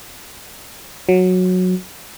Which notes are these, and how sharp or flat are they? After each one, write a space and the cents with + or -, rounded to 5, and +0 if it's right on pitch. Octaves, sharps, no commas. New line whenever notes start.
F#3 -15